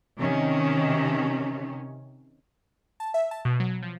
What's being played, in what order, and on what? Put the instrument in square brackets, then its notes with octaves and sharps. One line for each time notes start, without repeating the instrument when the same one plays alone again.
[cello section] C3 D#3 C#4
[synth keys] A5
E5
A5
B2
F#3
F3